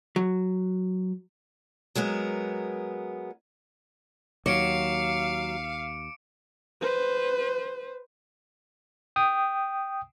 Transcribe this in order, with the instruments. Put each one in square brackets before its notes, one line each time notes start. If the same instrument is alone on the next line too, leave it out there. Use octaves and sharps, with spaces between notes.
[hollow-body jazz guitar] F#3
[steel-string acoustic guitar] F#3 G#3 B3 A#4
[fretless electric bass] D#2 [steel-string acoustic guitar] F#3 [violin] F5 [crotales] D6 C#7 D7
[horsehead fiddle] B4 C5
[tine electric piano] G5 D#6